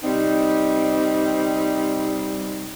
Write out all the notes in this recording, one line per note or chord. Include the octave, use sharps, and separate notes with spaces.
C3 G3 C4 D#4